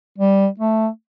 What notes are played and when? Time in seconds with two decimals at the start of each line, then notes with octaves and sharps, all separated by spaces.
0.18 G3
0.60 A3